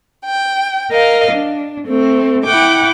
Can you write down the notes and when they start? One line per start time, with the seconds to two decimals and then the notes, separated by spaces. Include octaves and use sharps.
0.25 G5
0.91 A#4 D#5 F5
1.31 D4
1.86 A3 C4
2.45 E4 F#5 G5 D6